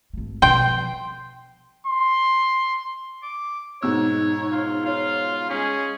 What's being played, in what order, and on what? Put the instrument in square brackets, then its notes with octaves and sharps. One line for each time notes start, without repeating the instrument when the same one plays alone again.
[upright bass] G#1 A3
[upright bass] B2 F3 [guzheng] G5 [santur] C6
[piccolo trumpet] C6
[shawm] D6
[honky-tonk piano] G#2 B2 E6 [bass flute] D#4 [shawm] C#5
[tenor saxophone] F4
[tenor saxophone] F4 [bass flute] C#5 [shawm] F5
[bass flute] G#3 [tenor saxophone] C#4 [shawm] G#4